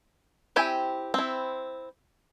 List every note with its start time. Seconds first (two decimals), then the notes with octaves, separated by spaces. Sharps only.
0.56 C4 E4 G4 G5 G#5
1.14 C4 E4